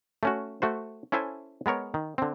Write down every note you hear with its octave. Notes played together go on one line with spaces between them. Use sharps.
A3 C#4 F#4
A3 F#4 C5
C#4 E4 A4 C5 E5 G#5
G#3 B3 A#4 C#5
D#3
D3 C4